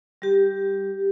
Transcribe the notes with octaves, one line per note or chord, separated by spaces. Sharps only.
G3 G4